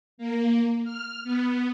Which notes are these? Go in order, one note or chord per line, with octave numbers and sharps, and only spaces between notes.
A#3
F6
B3